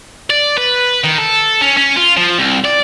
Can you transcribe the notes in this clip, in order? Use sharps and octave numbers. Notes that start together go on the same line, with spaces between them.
D5
B4
D#3
A4
C#4
C#4
F4
F3
C2
D5